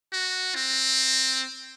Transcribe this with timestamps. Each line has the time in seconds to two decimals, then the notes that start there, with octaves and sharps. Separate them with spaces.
0.13 F#4
0.55 C4